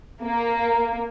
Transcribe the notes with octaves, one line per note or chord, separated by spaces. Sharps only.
A#3